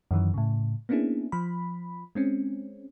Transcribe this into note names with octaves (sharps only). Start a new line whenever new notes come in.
F#2 D#3 E3 F#3
A2 C#3
A#3 B3 C#4 D4 E4 G#4
F3 B5
G#3 C4 C#4